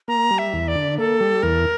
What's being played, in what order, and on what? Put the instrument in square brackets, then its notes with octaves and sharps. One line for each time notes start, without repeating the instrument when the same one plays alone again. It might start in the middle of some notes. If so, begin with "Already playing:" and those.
[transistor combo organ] A#3 [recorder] A#5
[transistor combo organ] G3
[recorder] E5
[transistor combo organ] E2
[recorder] D5
[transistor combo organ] D3
[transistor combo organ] A#3 [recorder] A4
[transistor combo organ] G3
[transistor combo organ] E2 [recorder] A#4